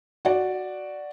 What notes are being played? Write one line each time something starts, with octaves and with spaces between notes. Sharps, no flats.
F#4 D5